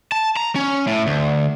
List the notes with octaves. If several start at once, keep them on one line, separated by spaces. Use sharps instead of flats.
A5
A#5
C#4
A2
D2